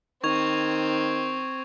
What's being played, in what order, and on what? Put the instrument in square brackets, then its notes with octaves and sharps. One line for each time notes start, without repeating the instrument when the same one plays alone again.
[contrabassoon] D#3 [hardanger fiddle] C4 [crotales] C#6 G#6 F7